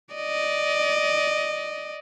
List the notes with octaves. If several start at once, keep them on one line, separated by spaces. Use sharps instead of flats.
D5 D#5